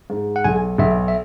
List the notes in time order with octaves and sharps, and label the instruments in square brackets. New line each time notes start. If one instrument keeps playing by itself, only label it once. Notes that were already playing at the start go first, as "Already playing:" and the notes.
[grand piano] G#2
[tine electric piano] F#5
[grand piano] B1 [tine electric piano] G#5
[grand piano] B1 [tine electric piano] E5
[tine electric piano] E5